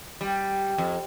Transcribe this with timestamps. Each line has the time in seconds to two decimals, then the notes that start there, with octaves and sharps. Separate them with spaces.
0.21 G3
0.78 F2